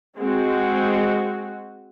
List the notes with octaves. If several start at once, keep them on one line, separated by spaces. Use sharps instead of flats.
G#3 C4 F#4